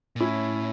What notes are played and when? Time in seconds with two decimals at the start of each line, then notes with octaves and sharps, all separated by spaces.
0.16 A#2
0.20 A2 C#4 E4